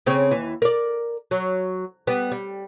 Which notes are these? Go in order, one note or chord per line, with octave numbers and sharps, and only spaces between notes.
C#3 C4 C#5
D#2 E3
A#4 D5
F#3
G3 B3
G3